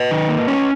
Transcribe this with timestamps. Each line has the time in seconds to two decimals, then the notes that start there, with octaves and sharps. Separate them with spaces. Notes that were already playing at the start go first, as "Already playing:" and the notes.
Already playing: B4 D#5
0.11 D#3
0.29 A#3
0.48 C#4